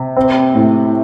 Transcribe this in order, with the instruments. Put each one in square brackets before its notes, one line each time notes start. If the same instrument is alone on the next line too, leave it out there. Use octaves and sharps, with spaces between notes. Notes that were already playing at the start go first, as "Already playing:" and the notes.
Already playing: [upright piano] C3
C4
A2